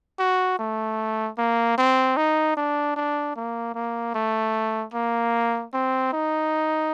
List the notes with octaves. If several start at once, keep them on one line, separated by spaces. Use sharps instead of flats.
F#4
A3
A#3
C4
D#4
D4
D4
A#3
A#3
A3
A#3
C4
D#4